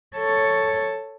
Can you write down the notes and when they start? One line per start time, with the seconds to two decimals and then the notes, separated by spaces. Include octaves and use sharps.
0.17 A4 C#5